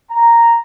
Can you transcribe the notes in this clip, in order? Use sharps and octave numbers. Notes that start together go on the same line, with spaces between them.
A#5